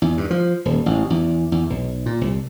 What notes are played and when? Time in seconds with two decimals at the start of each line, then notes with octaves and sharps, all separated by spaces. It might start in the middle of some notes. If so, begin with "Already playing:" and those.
0.02 E2
0.17 G2
0.30 F3
0.65 D#1
0.86 A1
1.10 E2
1.52 E2
1.70 B1
2.06 A#2
2.21 C2